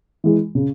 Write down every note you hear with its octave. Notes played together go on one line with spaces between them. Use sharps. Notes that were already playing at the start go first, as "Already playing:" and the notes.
E3 G#3
C#3